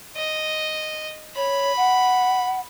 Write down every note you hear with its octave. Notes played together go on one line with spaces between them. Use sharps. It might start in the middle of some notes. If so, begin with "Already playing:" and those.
D#5
C#5 B5
F#5